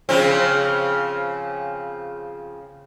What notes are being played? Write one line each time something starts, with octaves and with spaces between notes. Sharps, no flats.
C#3 F3 C4